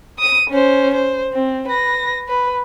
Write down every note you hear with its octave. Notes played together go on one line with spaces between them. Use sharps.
D#6 D#7
C#4 C5
C5
C4
B4 A#6
B4